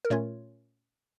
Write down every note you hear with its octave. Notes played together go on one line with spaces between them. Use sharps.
A#4
A#2 A3 C#4 F4 C#5